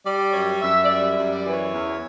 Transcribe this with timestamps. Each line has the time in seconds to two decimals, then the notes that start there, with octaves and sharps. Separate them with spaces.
0.05 G3 D5
0.33 F#2 C#5
0.62 F#2 E5
0.84 D5
0.90 G3 E5
1.11 E5
1.17 F#2
1.31 D5
1.45 E3 B4
1.53 C#5
1.74 E2